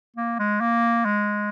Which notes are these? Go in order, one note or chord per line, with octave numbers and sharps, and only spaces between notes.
A#3
G#3
A#3
G#3